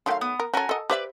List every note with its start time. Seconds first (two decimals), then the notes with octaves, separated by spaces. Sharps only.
0.06 D#3 F#3 A3 F5 G5 C6
0.21 B3 D#6
0.40 A#4
0.54 C#4 F#4 A4 A#4 G#5
0.69 A4 D#5
0.90 G4 B4 C5 D5 E5